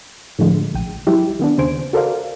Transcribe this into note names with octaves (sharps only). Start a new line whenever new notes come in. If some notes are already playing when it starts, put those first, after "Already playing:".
A2 D3 F3 G#3 A3
A#1 G5 D#7
F#3 G#3 E4 G4
D#3 B3 D4
D#2 C#3 C5 G#5 D7
F#4 A4 A#4 C5 D5 F5